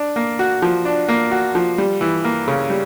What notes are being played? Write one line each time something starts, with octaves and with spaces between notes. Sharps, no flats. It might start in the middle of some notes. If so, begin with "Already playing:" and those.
Already playing: D4
A#3
F#4
F3
D4
A#3
F#4
F3
G3
E3
A#3
C#3
G3